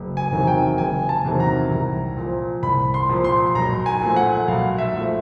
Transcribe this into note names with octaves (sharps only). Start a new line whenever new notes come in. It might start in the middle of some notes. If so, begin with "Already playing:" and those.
Already playing: F#1
G#5
E2 C3 D#3 F#3
G5
F#1 G#5
A5
E2 C3 D#3 F#3
A#5
C2
A#2 F3
C2 B5
C6
A#2 F3
C6
B1 A#5
G#5
A#2 F3 A3
F#5
B1 F5
E5
A#2 F3 A3